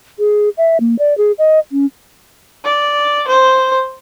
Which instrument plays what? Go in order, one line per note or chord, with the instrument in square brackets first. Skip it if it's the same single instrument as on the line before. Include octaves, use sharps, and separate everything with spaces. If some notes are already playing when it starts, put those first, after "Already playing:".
[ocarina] G#4
E5
A#3
D5
G#4
D#5
C#4
[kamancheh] D5
C5